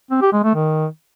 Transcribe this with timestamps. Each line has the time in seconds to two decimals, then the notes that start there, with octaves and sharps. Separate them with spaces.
0.11 C4
0.22 G4
0.33 G#3
0.44 A3
0.55 D#3